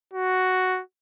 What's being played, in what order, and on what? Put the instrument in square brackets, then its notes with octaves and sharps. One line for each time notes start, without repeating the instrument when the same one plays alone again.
[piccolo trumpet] F#4